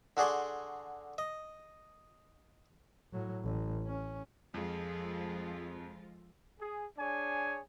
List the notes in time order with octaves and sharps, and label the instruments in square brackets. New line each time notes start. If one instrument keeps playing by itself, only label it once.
[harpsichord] D3 F#4 G#4 D5 C6
D#5
[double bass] A2 F#3
A1
C#4
[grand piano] F2 [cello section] F3 G#3 F4 [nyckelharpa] G#4 A4
[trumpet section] G#4
D4 G#4 C#5 G#5